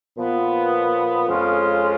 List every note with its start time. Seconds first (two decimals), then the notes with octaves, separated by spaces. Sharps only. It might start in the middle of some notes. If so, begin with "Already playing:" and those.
0.17 A#2 F3 B3
1.28 F2 C#3 G#3 C#4 F4